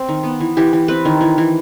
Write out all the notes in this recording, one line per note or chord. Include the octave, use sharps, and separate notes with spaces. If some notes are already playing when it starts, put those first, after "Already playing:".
Already playing: C4
D#3
B3
E3
E3 G4
E3
C4 B4
D#3
E3
E3